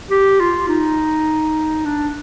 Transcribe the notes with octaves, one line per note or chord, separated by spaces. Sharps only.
G4
F4
D#4
D4